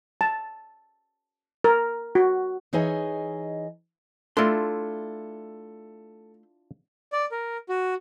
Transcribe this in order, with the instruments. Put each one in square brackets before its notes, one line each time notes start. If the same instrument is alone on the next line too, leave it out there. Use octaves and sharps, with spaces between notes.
[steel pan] A5
A#4
F#4
[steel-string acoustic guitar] E3 D#4 G#4 C#5 D#5 G#5
[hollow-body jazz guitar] A3 C6 [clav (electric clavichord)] D4 E4 F4 [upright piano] A4
[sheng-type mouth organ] D5
A#4
F#4